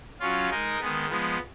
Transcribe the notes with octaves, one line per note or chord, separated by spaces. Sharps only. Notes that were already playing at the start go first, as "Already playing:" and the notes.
F#3 C#4 F4
G#3 D#4 A#4
D#3 G#3 B3
F3 G#3 B3